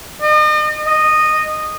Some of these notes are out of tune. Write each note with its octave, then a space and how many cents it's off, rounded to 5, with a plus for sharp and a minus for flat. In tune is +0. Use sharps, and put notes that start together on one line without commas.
D#5 -40
D#5 -15